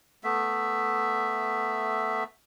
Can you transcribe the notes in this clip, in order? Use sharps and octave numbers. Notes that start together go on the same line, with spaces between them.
A3 B3 E5